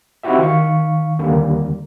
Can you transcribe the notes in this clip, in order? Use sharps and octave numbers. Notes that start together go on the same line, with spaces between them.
C4 D#4 E4 F#4 G4 E5
D#3 F5 C#6
D#2 D3 G3 A#3